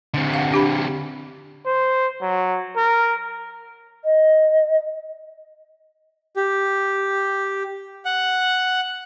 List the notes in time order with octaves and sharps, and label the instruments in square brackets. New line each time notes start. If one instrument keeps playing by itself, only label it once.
[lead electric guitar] D3 C4
[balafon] F5 F#5
D4 G4 B5
[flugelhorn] C5
F#3
A#4
[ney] D#5
[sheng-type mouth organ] G4
F#5